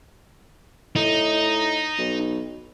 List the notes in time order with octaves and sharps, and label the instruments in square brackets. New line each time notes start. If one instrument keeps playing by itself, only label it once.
[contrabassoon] A2 [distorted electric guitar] D#4
[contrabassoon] B1